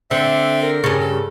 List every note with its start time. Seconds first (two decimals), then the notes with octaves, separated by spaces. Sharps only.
0.11 D3 C4 E5
0.62 A#4
0.84 G2 C#3
1.01 A4